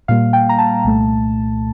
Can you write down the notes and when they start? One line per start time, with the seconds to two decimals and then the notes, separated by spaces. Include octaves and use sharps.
0.08 A#2 G3 A#3 F5
0.33 G5
0.49 A#5
0.58 A5
0.84 C2 A#2 A3